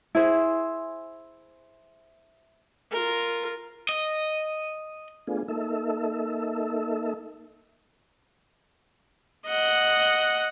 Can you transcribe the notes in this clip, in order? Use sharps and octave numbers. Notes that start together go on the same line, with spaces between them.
E4 G#4 C5
F4 A#4
D#5
A3 B3 D4 F4 G#4
A#3 D#4 A4 E5
D#5 F#5